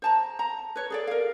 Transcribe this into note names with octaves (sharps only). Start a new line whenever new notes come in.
C5 A5 A#5
A#5
B4 C#5
G#4 A4 D5
A#4 F5